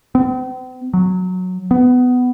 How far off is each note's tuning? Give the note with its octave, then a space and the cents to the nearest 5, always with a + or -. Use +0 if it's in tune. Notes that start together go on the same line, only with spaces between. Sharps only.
C4 -45
F#3 -15
B3 +15